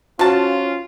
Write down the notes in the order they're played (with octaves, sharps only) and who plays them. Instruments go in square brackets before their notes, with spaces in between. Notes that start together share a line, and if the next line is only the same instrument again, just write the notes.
[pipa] F3 A5 [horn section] C#4 F4 [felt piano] F#4